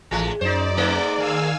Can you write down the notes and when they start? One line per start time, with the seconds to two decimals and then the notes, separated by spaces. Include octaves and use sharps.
0.11 A1 E3 G#3 A3
0.41 F#2 D#4 C5 D5
0.77 G#2 A3 D#4
1.18 D#3 F5 G#5 E6